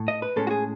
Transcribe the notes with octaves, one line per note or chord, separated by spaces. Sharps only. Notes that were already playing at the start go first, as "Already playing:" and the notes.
Already playing: A2
D#5
B4
A2 G#3 C#4 A4
F#4
G#4